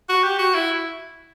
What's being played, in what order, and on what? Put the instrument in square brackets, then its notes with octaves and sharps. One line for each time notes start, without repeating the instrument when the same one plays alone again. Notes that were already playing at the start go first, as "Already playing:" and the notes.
[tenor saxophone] F#4
G4
F#4
E4